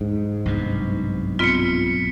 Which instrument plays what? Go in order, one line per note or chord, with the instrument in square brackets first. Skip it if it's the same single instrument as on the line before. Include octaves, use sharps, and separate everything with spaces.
[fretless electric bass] G#2
[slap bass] B1 G2 C3
[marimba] B3 C4 F4 [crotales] B6 C#7